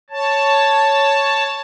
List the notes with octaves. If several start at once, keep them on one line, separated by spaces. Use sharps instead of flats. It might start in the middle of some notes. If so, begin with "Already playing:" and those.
C#5 A5